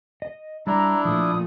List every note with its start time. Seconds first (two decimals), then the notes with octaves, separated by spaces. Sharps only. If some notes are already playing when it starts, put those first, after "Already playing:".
0.22 D#5
0.67 G3 D4 E4 A#5
1.05 A#2 F3 A3 D#6